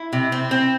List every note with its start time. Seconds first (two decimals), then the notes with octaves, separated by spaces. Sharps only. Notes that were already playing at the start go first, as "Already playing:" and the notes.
Already playing: E4
0.13 C3
0.32 C4
0.51 C4